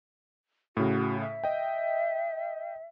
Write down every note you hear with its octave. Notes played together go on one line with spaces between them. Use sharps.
A2 C#3 F#4
E5
D#5 G5